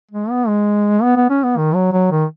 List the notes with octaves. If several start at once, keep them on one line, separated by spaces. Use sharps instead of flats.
G#3
B3
G#3
B3
B3
C#4
B3
D#3
F#3
F#3
D#3